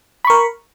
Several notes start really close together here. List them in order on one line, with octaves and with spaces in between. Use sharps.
B5 C#6 A#4